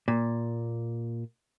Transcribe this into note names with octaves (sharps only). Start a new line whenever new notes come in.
A#2